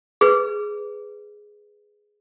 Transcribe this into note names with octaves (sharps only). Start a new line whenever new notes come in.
G#4 B4